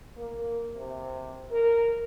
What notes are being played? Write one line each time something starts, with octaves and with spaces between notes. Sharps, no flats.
A#3
C3
A#4